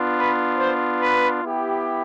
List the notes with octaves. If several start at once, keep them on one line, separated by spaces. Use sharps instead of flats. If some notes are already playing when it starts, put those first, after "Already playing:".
Already playing: B3 D4 F4
B4
C5
B4
B3 E4 G4